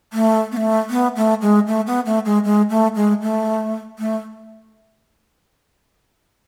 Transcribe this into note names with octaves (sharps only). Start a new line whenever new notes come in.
A3
B3
A3
B3
A3
G#3
A3
B3
A3
G#3
G#3
A3
G#3
A3
A3